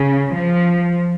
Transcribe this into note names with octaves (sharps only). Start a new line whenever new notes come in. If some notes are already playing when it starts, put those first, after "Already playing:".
Already playing: C#3
F3